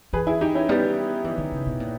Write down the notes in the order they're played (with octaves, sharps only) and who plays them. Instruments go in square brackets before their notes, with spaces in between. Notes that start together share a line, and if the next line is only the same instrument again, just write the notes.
[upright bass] E3 [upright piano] G#4 B4
[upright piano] E4 G#4
D#4 G4
C#4 E4
[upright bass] G3 [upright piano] B3 D#4
[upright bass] E3
D#3
C#3
B2
A#2